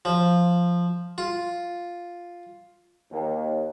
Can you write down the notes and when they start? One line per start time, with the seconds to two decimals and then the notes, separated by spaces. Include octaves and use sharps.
0.05 F3
1.18 F4
3.11 D#2